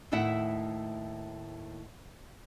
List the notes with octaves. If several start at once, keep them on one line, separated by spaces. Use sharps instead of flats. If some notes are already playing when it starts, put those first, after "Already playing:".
D#2 A2 A3 E4 E5 F#5